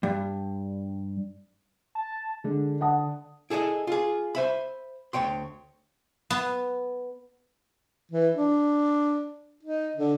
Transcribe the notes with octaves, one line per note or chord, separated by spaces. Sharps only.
G2
A5
D3 G#3 D4
F#5 A5 D#6
E4 G#4 A4 C#5 D#5
F4 G#4
C5 E5 B5
D2 G#2 C#5 G5 C6
B3
E3
D4
D#4
D3